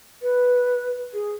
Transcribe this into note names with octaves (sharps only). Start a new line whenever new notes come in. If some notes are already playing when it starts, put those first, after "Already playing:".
B4
G#4